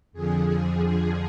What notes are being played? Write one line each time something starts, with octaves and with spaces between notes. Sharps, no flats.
F2 D3 F3 G#4